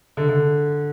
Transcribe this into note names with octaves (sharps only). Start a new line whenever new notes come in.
D3
D3